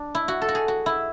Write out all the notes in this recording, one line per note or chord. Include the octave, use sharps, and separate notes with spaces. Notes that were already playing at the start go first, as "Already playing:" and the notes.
Already playing: D4
E4
F#4
A4
F#4
G#4
F#4
E4